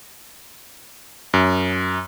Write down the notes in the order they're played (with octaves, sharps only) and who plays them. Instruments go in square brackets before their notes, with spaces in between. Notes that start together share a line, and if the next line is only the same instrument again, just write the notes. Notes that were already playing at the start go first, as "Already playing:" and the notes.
[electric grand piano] F#2